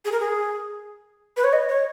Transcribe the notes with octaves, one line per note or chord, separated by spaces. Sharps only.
G#4
A#4
G#4
B4
C#5
D#5
C#5